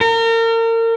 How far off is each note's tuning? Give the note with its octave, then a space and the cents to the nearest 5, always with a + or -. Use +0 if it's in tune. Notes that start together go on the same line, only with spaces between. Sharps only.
A#4 -35